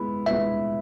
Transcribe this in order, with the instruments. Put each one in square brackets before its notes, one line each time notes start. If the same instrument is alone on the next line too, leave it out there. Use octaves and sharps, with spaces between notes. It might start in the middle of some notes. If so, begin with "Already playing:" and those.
Already playing: [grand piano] G#3 B3 E4 [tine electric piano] B5
[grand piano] G#3 B3 E4 B4 [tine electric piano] E5